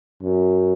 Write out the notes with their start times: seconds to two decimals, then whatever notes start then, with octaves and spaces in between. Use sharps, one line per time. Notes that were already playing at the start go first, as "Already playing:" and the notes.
0.22 F#2